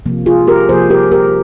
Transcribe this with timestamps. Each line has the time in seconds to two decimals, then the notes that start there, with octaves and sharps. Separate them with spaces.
0.06 C3 F3 A#3
0.26 F4 G#4
0.47 G4 A#4
0.69 C3 F3 A#3 G#4 C5
0.90 G4 A#4
1.12 G4 A#4